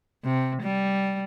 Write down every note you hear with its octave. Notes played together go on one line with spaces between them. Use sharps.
C3
G3